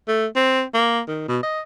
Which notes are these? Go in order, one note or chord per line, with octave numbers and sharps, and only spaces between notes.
A3
C4
A#3
D#3
B2
D#5